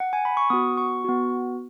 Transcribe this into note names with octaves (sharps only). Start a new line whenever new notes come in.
F#5
G#5
B5
C#6
B3 F#4 D#6
C#6
B3 F#4